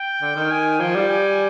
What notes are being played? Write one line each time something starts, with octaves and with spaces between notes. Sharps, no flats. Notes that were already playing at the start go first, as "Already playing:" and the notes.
Already playing: G5
D3
D#3
G#5
F3 G5
G3
G#5